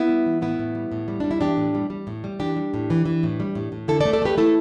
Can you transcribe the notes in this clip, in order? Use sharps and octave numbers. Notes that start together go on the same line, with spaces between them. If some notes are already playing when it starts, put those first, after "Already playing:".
Already playing: B3 E4
G3
E3
A2 B3 E4
A2
G3
A2
G3
G3 D4
E4
E3 D4 G4
A2
G3
G3
A2
G3
E3 D4 G4
G3
A2
E3
E3
A2
G3
A2
A2
D3 E4 A4
A4 D5
A3
A4 D5
A3 G4 B4
A3 E4 A4